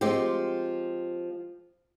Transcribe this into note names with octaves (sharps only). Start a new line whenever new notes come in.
F3 G#3 C4 G4